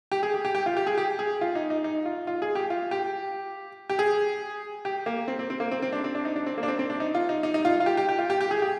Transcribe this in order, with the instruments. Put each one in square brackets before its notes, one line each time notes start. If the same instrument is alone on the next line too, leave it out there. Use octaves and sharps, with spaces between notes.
[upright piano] G4
G#4
G4
G4
G4
F4
G4
G#4
G4
G#4
F4
D#4
D#4
D#4
F4
F4
G#4
G4
F4
G4
G4
G#4
G4
A#3
C4
C4
C4
A#3
C4
C4
D4
C4
D4
D#4
D4
C4
A#3
D4
C4
C4
D4
D#4
F4
D#4
D#4
D#4
F4
F4
G4
G4
G4
F4
G4
G4
G#4
G4